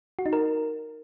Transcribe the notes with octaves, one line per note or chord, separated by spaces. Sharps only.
F#4
D#4
A#4